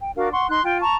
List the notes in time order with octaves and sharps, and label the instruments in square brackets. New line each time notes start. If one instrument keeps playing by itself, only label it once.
[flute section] G5
D4 F#4 A#4 F5
F#5 C6 C#6
D#4 C6 F#6
F4 G5
A5 A#5 C#6